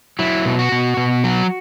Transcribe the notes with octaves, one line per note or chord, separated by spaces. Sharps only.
F#3 E4
B2
F#4
B2
B2
F#3